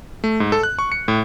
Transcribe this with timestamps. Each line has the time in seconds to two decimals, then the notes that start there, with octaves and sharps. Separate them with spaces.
0.24 A3
0.40 G#2
0.52 A4
0.63 F#6
0.79 C#6
0.92 C#7
1.08 A2